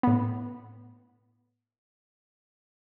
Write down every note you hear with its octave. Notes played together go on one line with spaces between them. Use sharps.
A2 B3